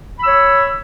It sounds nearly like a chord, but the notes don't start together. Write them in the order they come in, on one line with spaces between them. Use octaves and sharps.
B5 E6 C#5